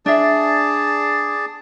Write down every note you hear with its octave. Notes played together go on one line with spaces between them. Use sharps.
D4 G#4 D5 E5 A5